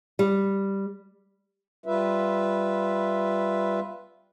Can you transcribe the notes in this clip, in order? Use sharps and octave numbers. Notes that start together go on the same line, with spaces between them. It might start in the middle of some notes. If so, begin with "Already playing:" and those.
G3
G3 F4 B4 E5